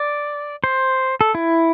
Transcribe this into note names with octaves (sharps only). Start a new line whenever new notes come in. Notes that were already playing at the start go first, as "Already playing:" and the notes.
Already playing: D5
C5
A4
E4